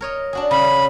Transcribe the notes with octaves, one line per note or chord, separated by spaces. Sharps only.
A#4 C#5 D#5
D4 F#4 G#4
C#3 B5